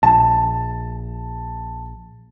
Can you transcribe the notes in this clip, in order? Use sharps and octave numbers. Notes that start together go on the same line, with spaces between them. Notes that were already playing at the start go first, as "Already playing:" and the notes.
A#1 A5